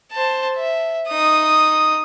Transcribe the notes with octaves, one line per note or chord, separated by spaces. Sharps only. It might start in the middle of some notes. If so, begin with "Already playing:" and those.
C5 A5
E5
D#4 D#6